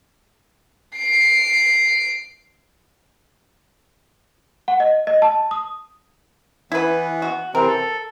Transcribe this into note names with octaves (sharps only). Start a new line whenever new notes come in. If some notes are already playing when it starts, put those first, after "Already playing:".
C7 D7
F#5
D#5
D#5
A5
D#6
E3 B3 E4 B4
F#4
C3 E3 C4 A#4
A4